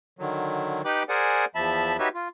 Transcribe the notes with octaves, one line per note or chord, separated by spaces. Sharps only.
D3 D#3 F#3
D#4 G4 B4 G5 B5 D6
G#4 A#4 C5 D5 F#5 G#5
E2 F3 E5 A5 B5
D#4 F#4 G4 B4 C#5 E5
F4